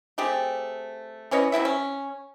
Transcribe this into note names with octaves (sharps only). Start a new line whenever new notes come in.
A3 C4 G4 G#4
E3 C#4 C#5 D#5
C3 F#3 E4 E5
C#4